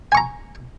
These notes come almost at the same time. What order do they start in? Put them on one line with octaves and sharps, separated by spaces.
G#5 C#6 A#5